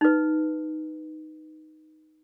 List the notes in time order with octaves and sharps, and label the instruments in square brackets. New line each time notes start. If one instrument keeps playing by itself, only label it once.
[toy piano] D#4 B4